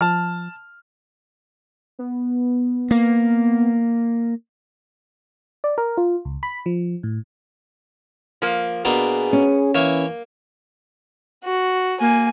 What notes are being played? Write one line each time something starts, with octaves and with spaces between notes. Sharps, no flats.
F3 A5 F6
B3
A#3
D5
A#4
F4
C#2
B5
F3
A2
F3 A#3
B2 A#3 B3 D4 G#4
C#4
E3 A#3 C#5 E5
F#4
A#3 G#5